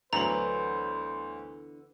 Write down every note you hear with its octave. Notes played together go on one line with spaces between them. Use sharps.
D2 D3 E3 F#3 B3 C5 A#5 F#7